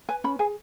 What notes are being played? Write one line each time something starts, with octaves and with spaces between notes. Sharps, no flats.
B4 G#5
C#4 B5
G#4 G#5